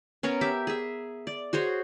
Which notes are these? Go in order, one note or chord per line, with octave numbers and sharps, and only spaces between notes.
B3 C#4 A#4 C#5
G4 E5 D6
G#4 E5
D5
F#4 G#4 C5 C#5